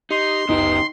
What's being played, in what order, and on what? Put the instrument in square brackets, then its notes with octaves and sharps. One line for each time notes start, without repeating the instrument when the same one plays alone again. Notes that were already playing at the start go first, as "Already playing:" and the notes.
[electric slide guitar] D#4 [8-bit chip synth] G4 [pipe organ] C6
[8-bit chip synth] G1 C#2 F#2 [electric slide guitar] C#3 B3 G4 [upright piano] D#4